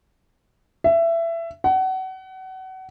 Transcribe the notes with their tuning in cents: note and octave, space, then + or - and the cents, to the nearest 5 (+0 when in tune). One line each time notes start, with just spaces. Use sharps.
E5 +20
F#5 +30